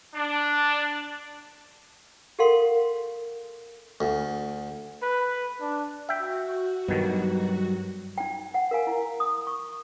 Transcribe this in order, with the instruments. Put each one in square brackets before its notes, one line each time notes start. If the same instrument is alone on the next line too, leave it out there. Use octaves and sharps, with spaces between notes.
[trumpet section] D4
[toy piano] G4 A4 A#4 F5 F#5 C6
[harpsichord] D2
[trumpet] B4
D4
[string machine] F#4 [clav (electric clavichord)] E5 G5
[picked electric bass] G2 [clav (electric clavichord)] B2 D#3 [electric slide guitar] F#3 G3
[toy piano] D#4 G5
F#5
A#4 F5 G#5
E4
D#6
C#6